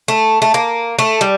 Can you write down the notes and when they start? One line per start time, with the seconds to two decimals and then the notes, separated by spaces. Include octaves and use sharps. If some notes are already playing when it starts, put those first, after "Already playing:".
0.08 A3
0.42 A3
0.54 A#3
0.99 A3
1.21 G3